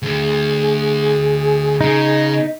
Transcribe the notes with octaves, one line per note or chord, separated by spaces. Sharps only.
D2 D3 G#4
C#3 D#4